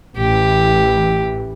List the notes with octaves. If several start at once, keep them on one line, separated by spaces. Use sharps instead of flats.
A1 E3 G4